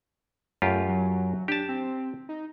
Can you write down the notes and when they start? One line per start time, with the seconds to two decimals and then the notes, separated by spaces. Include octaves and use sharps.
0.62 F#2 A3 F4 G4
0.89 F#3
1.48 D4 G4 A5
1.69 C4
2.29 D#4